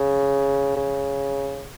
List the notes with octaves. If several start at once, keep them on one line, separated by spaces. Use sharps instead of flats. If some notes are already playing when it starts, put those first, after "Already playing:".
Already playing: C#3
C#3